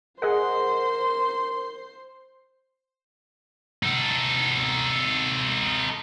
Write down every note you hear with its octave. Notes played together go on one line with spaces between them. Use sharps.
G#4 A#4 C5 D#5 F#5 C6
D#4 A4